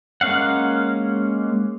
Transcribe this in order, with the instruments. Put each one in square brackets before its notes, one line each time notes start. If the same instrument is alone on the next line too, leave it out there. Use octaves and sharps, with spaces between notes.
[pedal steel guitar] G#3 A#3 C#4 F5 F#5